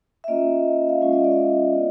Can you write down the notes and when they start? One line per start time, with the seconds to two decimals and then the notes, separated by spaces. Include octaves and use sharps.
0.24 E5
0.28 A#3 C#4 F4 D#5
0.89 F5
1.01 G#3 C#4 F4 E5
1.13 D#5
1.24 D5
1.31 E5
1.37 D#5
1.73 B3 D4 F4